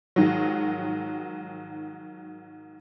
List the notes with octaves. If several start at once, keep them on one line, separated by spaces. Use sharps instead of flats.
G#2 D#3 F3 F#3